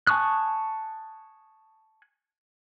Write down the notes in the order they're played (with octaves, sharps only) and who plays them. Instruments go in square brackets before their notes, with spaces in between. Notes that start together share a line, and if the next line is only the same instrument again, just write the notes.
[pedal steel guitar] G#5 A5 C#6 D#6 F#6